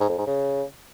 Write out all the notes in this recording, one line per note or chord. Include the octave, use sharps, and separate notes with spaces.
G#2
F2
G#2
C#3